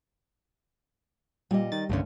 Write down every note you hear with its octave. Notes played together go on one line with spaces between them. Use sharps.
A#2 G3 D#5
D#3 A6
C2 G2 D3 A3 C#4